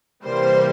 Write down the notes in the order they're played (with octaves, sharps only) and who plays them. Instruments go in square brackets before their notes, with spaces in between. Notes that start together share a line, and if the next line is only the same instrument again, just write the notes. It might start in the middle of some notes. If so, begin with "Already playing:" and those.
[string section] C3 E3 G3 A#3 C5